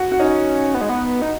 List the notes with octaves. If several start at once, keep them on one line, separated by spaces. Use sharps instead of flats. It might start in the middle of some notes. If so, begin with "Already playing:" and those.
Already playing: F#4
F#4
C#4 D#4
B3
G#3
B3
D#4